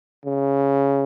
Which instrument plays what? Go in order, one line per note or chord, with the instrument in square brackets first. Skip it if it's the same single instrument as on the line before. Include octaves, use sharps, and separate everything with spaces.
[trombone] C#3